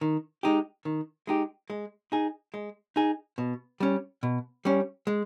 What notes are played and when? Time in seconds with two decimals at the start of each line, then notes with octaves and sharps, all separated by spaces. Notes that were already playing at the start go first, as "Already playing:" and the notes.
0.01 D#3
0.43 G#3 D#4 G4
0.85 D#3
1.27 G#3 D#4 G4
1.70 G#3
2.12 D#4 G#4
2.54 G#3
2.96 D#4 G#4
3.38 B2
3.80 G3 C#4
4.23 B2
4.65 G3 C#4
5.07 G#3